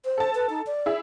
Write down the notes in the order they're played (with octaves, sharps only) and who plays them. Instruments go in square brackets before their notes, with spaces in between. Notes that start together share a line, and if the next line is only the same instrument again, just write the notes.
[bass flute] C5
[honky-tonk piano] A4 A5
[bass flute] B4
D#4
D5
[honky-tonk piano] E4 G#4 E5